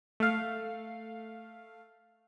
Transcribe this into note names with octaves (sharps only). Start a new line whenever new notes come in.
A3 F5